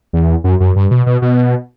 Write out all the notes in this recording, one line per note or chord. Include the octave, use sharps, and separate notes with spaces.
E2
F#2
F#2
G2
B2
B2
B2